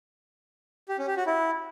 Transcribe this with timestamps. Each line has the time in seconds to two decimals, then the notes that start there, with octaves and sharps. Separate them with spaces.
0.89 G4
0.98 C#4
1.08 G4
1.17 F#4
1.27 E4